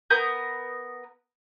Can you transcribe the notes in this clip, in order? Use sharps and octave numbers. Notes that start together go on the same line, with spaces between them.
B3 A#4 D#6 G6